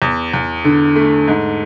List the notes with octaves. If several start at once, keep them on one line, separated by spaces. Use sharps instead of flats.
E2
E2
D3
A3
G#2